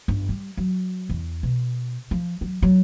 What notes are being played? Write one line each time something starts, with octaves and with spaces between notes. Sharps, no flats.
G1
G3
F#3
E2
B2
F3
F#3
F#3